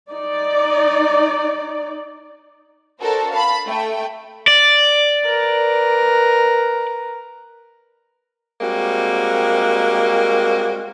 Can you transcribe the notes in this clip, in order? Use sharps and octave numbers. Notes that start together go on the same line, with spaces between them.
D#4 D5
D4 F#4 A4 A#4 C5
F5 A5 B5
A3 G5
D5
A#4 B4
G3 G#3 A#3 C4 F#4